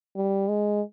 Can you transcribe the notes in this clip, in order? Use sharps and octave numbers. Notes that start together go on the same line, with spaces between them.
G3
G#3